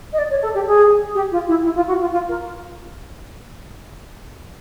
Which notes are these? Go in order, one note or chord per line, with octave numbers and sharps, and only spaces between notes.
D#5
D5
C#5
A4
G4
G#4
G4
F4
E4
E4
F4
F#4
F4
F4
A#4